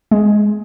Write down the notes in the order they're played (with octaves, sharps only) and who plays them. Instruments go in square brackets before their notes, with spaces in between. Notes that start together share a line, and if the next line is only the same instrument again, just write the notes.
[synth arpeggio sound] G#3